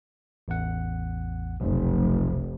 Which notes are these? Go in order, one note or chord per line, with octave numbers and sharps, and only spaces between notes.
A1 E2 F#5
F1 B1